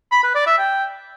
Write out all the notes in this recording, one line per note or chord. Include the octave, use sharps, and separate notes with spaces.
B5
B4
D5
E5
G5